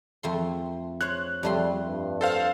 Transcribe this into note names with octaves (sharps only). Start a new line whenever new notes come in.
F2 A3 C6
C5 C#5 F#6
F2 G3 A3 C6
G2
A4 C5 F5